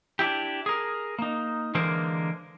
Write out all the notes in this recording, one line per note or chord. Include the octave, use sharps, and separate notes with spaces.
D4 E4 G4
G#4 A#4
A#3 D#4
D3 E3 G#3 A#3 A#4 C5